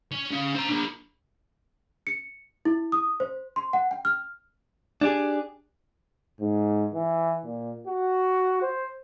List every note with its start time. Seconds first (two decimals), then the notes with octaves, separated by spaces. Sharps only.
0.12 C#4
0.31 C#4 F5
0.55 C5 A#5
0.69 D4 F4
2.07 C#7
2.65 E4
2.92 D#6
3.20 C5
3.56 C6
3.73 F#5
3.91 G5
4.05 F6
5.01 D4 G4 G#4
6.40 G#2
6.94 E3
7.45 A#2
7.87 F#4
8.62 C5